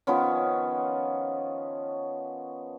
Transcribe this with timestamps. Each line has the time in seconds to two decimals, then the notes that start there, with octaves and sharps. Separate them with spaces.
0.07 D#3 F3 B3 C#4